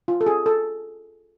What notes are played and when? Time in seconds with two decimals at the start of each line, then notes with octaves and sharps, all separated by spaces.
0.08 F4
0.21 A4
0.26 G#4
0.46 A4